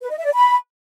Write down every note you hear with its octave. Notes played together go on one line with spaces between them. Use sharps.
B4
D#5
E5
D5
B5